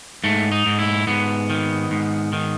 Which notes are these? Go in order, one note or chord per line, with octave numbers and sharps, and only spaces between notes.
G#2 A3
D#4
G#2
E4
G#2 B3
D#3
G#2
D#3